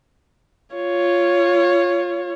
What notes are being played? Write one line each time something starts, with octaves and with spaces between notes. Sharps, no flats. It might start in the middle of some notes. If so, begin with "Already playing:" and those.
F4 C#5